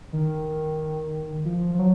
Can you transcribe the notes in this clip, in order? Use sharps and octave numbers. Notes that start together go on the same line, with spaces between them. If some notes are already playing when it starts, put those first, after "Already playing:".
D#3
F3
F3
F#3